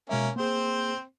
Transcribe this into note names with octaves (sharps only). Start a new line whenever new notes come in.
B2 G#3 A#3 C#4 E5
A#3 C4 G#4 C5